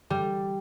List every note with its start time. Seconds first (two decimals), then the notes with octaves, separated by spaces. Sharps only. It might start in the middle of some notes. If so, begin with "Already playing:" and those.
0.10 G3